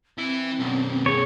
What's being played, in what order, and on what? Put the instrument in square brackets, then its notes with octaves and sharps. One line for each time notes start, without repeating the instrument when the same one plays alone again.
[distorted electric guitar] E3 E4 [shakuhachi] C4
[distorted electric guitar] B1 F#2
[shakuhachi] G#4 [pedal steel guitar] C#5